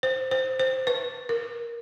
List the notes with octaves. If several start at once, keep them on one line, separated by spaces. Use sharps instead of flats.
C5
C5
C5
B4
A#4